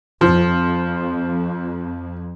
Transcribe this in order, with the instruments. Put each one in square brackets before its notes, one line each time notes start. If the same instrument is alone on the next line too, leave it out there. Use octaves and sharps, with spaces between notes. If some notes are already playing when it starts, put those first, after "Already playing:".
[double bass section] F2 [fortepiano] F3